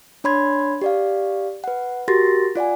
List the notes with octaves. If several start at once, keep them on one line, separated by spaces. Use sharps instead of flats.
D4 C#5 B5 C6 G#6
G4 D5 F5
B4 F#5
F#4 G4 A#4 C6 A6 A#6
F4 D5 F#5 G#5